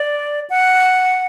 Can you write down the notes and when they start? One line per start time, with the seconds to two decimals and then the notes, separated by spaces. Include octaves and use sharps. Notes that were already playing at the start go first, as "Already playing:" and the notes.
Already playing: D5
0.50 F#5